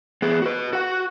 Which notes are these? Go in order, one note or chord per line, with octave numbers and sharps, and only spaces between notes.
B3 G#4
F#4 B4
F#4 F#5